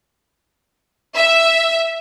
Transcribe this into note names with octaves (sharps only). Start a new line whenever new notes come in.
E5